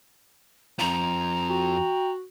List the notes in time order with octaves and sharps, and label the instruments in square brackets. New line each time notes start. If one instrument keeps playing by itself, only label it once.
[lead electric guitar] F2 F4 [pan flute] A#5
[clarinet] F#4 [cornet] G5